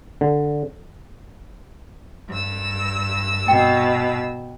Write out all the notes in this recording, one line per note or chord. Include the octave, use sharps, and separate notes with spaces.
D3
G2 E6
B2 G5